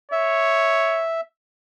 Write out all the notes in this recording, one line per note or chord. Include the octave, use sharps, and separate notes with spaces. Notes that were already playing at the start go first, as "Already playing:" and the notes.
C#5 E5